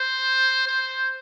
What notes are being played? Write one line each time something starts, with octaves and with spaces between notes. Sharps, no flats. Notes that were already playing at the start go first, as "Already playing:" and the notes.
Already playing: C5
C5